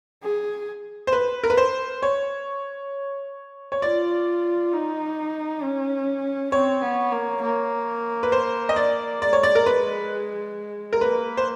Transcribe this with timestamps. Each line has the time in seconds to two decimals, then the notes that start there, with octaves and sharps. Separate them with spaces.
0.23 G#4
1.07 C5
1.13 B4
1.44 A#4
1.50 B4
1.57 C5
2.03 C#5
3.72 C#5
3.82 F4 D5
4.73 D#4
5.63 C#4
6.52 C4 C#5
6.82 B3
7.12 A#3
7.42 A#3
8.23 B4
8.32 C5
8.69 D#5
8.76 D5
9.22 G#3 D5
9.33 C#5
9.43 D5
9.55 A#4
9.66 B4
10.93 A#4
11.01 A#3 B4
11.37 C5